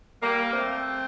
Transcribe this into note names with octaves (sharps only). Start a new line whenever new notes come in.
G3 A#3
A3 C4